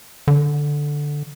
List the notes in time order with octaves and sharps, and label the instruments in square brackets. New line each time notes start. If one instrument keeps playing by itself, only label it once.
[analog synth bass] D3